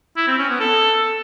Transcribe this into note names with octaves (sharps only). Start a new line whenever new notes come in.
E4
C4
C#4
B3
A4